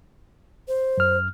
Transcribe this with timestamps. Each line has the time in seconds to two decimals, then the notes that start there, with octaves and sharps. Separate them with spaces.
0.68 C5
0.98 F#2 F6